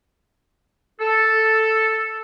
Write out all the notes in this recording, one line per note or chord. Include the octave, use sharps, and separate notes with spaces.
A4